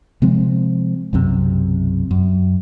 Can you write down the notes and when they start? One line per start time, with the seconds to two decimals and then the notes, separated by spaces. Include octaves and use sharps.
0.22 C3 F3 G#3 C4
1.13 B1 F#2 C3
2.11 F#2